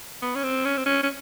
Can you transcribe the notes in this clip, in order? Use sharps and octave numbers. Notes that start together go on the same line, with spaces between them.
B3
C#4
C4
C#4
C4
C#4
C#4